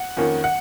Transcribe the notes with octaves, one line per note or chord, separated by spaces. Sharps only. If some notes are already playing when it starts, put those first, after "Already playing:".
Already playing: F#5
F2 D#3 A#3 C#4
F#5